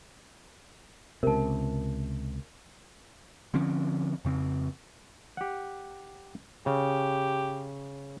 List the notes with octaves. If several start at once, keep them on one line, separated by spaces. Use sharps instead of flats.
C#2 C3 A#4 A5
D3 F3 C4 C#4
F2 C#3 C4
G4 F#5
C#3 G4